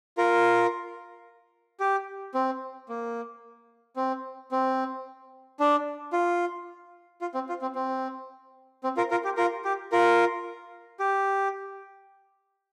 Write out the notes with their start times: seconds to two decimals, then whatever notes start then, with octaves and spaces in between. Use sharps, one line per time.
0.18 F4 A#4
1.80 G4
2.34 C4
2.89 A#3
3.96 C4
4.51 C4
5.60 D4
6.13 F4
7.21 F4
7.34 C4
7.49 F4
7.62 C4
7.75 C4
8.84 C4
8.97 F4 A#4
9.11 F4 A#4
9.24 G4
9.37 F4 A#4
9.65 G4
9.92 F4 A#4
11.00 G4